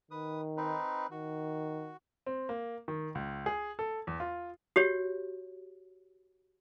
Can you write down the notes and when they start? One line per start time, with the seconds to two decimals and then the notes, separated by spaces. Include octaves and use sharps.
0.11 D#3 B4 D#6
0.57 C4 D#4 B4
1.11 D#3 F#4
2.26 C4
2.49 A#3
2.88 D#3
3.15 C#2
3.46 G#4
3.79 A4
4.07 E2
4.20 F4
4.76 F#4 G4 C#5